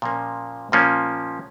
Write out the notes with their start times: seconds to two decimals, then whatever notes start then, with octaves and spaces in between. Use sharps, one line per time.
0.02 A#2 F3 A#3 C#4
0.72 A#2 F3 A#3 C#4